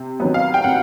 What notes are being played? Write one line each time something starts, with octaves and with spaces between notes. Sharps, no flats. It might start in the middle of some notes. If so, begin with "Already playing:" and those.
Already playing: C3
D#3 F#3 B3
F5
G5
C3 F#5